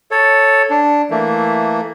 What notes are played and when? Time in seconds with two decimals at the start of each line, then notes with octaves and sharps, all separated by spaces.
0.11 A4 C#5
0.70 D4
1.11 E3 A3 A#3